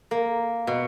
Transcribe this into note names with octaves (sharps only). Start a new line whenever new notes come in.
A#3
B2